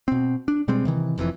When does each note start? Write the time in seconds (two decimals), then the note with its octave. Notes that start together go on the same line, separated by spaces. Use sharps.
0.08 B2 C4
0.48 D4
0.68 B2 G3 G#3 C4
0.85 C3 D#3 E3
1.18 F1 F2 A2 E3